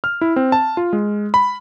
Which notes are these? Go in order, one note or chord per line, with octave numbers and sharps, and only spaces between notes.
F6
E4
C4
A5
F4
G#3
B5